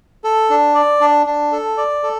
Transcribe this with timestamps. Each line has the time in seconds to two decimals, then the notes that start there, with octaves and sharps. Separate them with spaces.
0.24 A4
0.50 D4
0.75 D5
1.01 D4
1.26 D4
1.52 A4
1.78 D5
2.03 A4